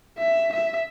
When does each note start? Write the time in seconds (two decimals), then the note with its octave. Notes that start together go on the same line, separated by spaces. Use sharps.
0.18 E5
0.53 E5